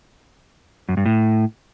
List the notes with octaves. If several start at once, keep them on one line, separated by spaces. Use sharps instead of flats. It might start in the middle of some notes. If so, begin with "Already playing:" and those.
F#2
G2
A2